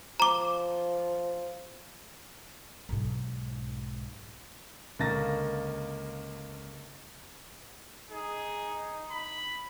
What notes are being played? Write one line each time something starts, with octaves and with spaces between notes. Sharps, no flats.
F3 A#5 D6
B1 G#2
C#2 D3 A#3 A6 A#6
D#4 G#4
B5